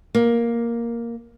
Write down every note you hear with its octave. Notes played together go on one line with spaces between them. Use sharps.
A#3